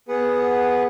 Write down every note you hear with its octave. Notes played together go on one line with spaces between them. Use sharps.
B3 G#4 B4 F#5